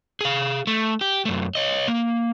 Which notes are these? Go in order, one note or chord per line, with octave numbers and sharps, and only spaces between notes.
G#4 F5
A3
G4
F#2 A3
C#5 D#5
A#3